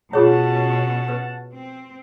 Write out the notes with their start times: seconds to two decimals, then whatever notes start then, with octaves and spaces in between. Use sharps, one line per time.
0.13 B2 C#4 F4 G#4 C#5 F#5 A5
1.08 B4
1.53 C4